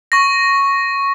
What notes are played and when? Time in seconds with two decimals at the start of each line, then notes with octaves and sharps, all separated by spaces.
0.12 C#6 A#6